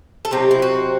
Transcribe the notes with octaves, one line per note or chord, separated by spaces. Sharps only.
A4
C3 F#3 C4 D#4 G4
E4
F#4